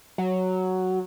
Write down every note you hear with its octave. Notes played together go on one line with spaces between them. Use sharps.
F#3